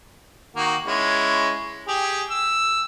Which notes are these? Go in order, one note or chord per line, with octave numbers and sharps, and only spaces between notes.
D#3 A#3 F#4
G#3 C#4 E4
G4 G#4
E6